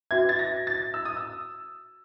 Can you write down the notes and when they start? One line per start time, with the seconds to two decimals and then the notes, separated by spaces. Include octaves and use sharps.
0.11 C#4 F#4 B4 E5 G#6
0.29 A6
0.39 A#6
0.67 A6
0.94 E6
1.05 D#6
1.17 E6